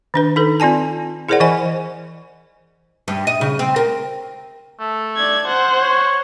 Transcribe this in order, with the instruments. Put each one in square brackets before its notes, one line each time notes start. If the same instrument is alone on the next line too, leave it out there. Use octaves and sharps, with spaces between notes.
[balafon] D#3 D4 B4
D#4 A4 B4
C4 F4 D5 G#5 A5
E4 G#4 A#4 C5 D5 F#5
E3 C5 D#5 G#5 B5
[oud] G2
D#5
C#3
C4
A#4
[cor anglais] A3
[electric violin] D5 G#6
C5 F#5
[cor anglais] C#5